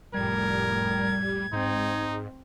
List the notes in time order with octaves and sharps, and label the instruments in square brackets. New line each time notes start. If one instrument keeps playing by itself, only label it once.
[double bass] F1 A2 [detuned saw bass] G3 [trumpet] A#4 [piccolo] G#6
[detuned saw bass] G#2 [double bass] C4 [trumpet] D#4